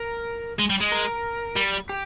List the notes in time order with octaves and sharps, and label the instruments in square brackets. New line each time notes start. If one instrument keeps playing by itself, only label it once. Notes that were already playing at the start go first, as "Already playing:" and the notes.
Already playing: [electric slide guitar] A#4
[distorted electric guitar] G#3
G3
G#3
[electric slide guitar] A#4
[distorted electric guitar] G3
[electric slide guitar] G4